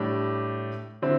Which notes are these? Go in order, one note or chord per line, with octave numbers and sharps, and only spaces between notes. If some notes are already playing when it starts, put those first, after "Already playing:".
Already playing: A2 G3 D4 G4
D3 C4 E4